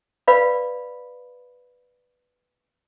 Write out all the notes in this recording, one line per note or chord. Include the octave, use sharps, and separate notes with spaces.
B4 D5 F5 B5